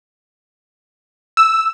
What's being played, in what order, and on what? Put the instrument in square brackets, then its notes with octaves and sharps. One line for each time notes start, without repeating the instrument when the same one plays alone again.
[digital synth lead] E6